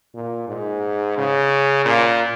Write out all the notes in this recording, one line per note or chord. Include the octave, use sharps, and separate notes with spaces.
A#2
G#2
C#3
A#2